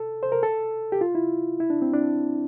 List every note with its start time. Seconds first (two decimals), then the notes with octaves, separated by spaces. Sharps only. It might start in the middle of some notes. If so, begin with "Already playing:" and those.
Already playing: A4
0.23 C5
0.32 A#4
0.43 A4
0.92 G4
1.01 F4
1.15 E4
1.60 E4
1.70 D4
1.82 C4
1.94 D4